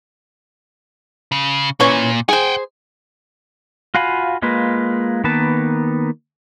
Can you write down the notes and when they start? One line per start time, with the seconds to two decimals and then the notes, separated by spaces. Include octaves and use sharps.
1.32 C#3
1.80 A#2 E3 C#4 C#5
2.29 G#4 C5 F#5 G5
3.95 F4 F#4 F5 G#5 B5
4.42 G#3 A#3 F4 B4
5.24 D#3 A#3 B3 B4 A5